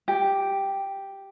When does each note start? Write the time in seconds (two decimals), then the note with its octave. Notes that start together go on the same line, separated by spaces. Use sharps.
0.08 G4